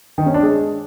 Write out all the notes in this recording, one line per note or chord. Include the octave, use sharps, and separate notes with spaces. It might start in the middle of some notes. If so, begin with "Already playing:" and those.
D#3
C#4
D4
G#3